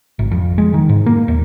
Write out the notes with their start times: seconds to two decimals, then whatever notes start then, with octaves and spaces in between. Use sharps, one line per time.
0.19 G#1
0.31 F2
0.58 G#3
0.74 D#3
0.89 G#2
1.06 A#3
1.28 D#2